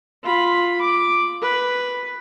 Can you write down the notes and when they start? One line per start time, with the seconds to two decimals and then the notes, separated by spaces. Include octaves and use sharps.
0.23 F4 B5
0.81 D6
1.42 B4